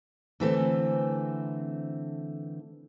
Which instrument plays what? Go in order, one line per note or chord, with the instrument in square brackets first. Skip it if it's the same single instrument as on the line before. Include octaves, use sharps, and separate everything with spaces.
[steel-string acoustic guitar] D3 E3 A3 C4